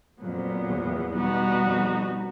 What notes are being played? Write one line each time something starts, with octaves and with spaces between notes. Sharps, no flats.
F2 A#2 F#3 B3
E2
B2 G3 B3 D#4 F#4
F2